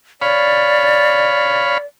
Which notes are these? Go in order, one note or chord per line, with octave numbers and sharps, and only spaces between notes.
C#5 D5 F5 B5